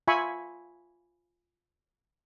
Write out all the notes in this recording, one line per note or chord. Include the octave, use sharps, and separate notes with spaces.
F4 E5 G#5 B5 C#6